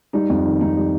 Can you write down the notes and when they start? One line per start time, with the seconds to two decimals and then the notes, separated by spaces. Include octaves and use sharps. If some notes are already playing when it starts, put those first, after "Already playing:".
0.13 G3 D#4
0.30 F2
0.46 D#3
0.61 F2 D#4
0.77 G3